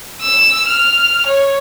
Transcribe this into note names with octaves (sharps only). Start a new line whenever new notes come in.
E6
F6
C#5